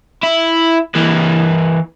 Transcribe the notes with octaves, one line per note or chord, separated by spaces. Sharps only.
E4
E3 A#3